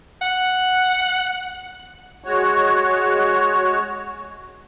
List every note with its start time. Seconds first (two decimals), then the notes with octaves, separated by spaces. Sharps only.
0.22 F#5
2.24 G#3 F#4 C#5